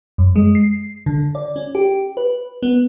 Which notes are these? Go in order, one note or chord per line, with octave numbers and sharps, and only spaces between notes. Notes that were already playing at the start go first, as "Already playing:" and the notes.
F#2
G#3
C7
D3
D5
C#4
G4
B4
B3